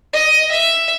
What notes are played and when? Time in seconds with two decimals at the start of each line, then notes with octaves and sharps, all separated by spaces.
0.13 D#5
0.51 E5